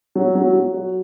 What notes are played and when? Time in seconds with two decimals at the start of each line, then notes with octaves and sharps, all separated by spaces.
0.15 F#3
0.35 F#3
0.53 F#3
0.73 F#4